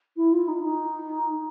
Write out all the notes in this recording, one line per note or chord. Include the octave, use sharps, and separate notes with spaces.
E4
F4
D#4
D#4